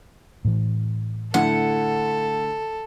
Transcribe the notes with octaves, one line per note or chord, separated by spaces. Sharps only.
A2 E3
D3 A3 E4 A4 F#5